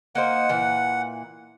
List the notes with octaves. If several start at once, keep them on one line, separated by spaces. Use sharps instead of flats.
A#3 D#4 C5 F#5
A#2 E3